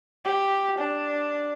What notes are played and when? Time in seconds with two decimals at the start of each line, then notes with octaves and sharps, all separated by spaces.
0.25 G4
0.78 D4